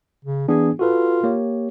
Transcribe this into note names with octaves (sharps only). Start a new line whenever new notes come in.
C#3
E3 B3 D4 G#4
F4 F#4 A4 B4
A#3 G4 C#5